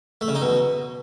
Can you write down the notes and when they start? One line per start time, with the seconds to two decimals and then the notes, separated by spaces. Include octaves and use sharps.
0.21 A3
0.28 C#3
0.35 D#4
0.42 B2